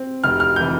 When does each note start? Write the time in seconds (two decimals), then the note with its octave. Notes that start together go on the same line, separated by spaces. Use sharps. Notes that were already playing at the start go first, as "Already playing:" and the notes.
Already playing: C4
0.24 F1 F6
0.40 F6
0.56 C3 E3 G6